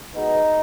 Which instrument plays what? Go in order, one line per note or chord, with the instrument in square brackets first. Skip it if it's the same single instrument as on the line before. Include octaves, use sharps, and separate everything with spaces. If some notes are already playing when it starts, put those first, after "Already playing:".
[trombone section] B2 G#3 B3 D#4